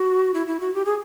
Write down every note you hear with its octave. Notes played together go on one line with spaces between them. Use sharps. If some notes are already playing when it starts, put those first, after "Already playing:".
Already playing: F#4
E4
E4
F#4
G4
G#4